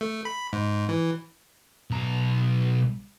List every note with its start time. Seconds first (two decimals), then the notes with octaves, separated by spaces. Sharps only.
0.01 A3
0.25 B5
0.53 G#2
0.89 E3
1.91 B1 A#5